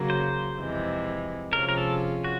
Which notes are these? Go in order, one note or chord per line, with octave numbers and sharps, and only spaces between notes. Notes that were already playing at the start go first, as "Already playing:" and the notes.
Already playing: C#3 F#3 A#3
C5
F2 C3 E3 G#3
C3 F3 G#3 C#4 F4 A#4
A#4
A4
F#4